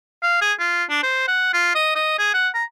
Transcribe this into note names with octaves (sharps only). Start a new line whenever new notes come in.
F5
G#4
F4
D4
C5
F#5
F4
D#5
D#5
G#4
F#5
A#5